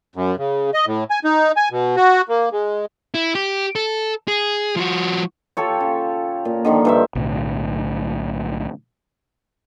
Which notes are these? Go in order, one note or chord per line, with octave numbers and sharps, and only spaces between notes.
F#2
C#3
D#5
A2
G#5
D#4
G#5
B2
F#4
A#3
G#3
E4
G4
A4
G#4
F3 F#4
F4 G4 A4 C#5
C#3
A#2
D3 D#3 F3
G2 C5 E5
B1 A2 D3